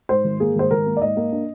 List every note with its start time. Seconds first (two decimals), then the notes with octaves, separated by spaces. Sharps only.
0.09 G#2 C5
0.24 G#1
0.40 A#3 G#4
0.55 G#1 C5
0.71 G#1 A#4
0.86 A#3
0.97 D5
1.02 G#2 D#5
1.17 A#3
1.32 D4